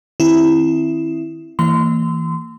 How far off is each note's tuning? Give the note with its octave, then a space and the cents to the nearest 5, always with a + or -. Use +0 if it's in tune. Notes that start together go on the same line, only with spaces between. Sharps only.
D#3 +0 C4 +10 E4 +0
E3 -15 A#3 -35 C6 -30